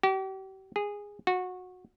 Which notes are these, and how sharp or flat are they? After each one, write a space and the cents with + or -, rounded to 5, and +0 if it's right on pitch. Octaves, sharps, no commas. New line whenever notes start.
G4 -40
G#4 -15
F#4 -20